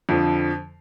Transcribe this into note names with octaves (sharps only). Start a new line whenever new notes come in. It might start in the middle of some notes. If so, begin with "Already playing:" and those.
F2 D3 F3